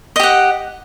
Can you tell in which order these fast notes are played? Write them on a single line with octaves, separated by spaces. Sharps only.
D#5 G4 F#5